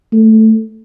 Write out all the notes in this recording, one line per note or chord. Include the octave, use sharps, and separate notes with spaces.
A3